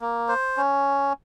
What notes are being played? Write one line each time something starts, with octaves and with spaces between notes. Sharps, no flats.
A#3
C5
C#4